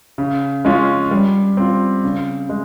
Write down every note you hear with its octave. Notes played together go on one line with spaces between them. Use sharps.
C#3
G#3 C#4 F4
G3
C4 F4
C#3
G#3